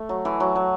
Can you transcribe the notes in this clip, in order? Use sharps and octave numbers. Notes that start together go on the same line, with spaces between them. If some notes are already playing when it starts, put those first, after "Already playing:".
Already playing: A3
F#3
E3
F#3
F#3